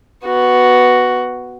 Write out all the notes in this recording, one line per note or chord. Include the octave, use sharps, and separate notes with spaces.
B3 F#4